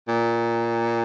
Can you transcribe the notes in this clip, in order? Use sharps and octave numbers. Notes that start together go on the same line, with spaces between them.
A#2